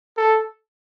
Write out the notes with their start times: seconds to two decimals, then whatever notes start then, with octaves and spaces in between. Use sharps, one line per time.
0.17 A4